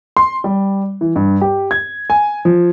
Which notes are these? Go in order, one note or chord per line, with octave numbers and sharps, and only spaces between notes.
C6
G3
E3
G2
G4
G#6
G#5
F3